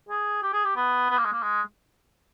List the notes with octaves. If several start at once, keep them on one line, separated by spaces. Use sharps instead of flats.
G#4
G4
G#4
G4
B3
B3
A#3
G#3
A#3
G#3